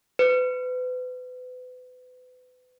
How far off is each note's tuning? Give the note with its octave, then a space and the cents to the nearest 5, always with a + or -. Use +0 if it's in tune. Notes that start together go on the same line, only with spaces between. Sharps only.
B4 +35